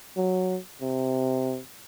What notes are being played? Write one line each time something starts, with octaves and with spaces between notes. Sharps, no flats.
F#3
C3